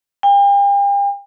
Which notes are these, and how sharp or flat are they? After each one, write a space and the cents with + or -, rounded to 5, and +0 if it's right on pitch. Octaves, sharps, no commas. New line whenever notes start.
G5 +40